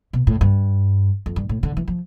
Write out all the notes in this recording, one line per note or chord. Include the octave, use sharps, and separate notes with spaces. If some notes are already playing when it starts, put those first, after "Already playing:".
B2
A2
G2
F2
G2
A2
D3
E3
F3